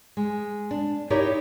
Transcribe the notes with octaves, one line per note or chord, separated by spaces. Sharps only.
G#3
D4
D#4 E4 G4 A#4 C#5 D5